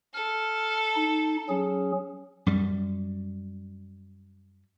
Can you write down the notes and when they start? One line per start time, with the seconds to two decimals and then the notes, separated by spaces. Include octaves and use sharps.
0.14 A4 F6
0.96 D#4
1.49 F#3 C#4 G#4
2.46 F#2 G3